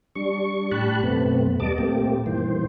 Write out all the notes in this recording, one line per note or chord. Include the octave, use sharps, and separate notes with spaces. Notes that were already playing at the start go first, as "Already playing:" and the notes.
G3 D4 C#6
A2 G4 A5 B5 F#6
F#2 B2 A3 B3 C4
D#2 G3 B3 D#5 A5 D6
A#2 A3 A#3 C4 G4
G2 A#2 D#3 E3 C5